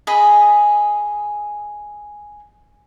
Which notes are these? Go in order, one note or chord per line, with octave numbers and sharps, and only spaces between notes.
G#4 D#5 B5